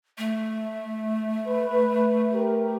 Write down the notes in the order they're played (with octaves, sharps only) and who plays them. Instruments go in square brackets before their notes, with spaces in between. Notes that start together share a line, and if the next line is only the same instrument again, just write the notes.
[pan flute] A3
[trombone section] B4
G4 A#4